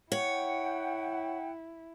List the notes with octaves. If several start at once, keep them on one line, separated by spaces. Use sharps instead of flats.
E4 C#5 F#5 G5